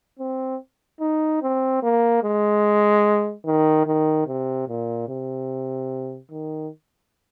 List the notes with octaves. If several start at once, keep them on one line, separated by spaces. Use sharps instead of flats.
C4
D#4
C4
A#3
G#3
D#3
D#3
C3
A#2
C3
D#3